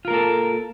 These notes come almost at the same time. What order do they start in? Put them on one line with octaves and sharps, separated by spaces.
F4 A#4 A#3 A4